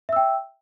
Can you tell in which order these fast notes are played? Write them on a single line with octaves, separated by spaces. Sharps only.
E5 E6 G5